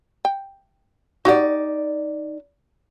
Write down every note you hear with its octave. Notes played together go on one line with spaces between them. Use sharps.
G5
D#4 F#4 G4 D5 F#5